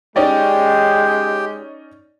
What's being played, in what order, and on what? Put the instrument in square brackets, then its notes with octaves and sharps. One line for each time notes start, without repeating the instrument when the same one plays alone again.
[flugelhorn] G#3 [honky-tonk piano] C#4 D#4 D5 [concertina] G4 G5